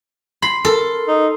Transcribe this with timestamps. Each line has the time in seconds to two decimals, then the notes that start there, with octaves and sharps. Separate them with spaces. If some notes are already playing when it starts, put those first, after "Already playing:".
0.42 B5 C6 C7
0.65 A4 A#4
1.08 D#4